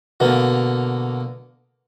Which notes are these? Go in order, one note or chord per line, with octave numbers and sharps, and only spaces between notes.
B2 D3 A#3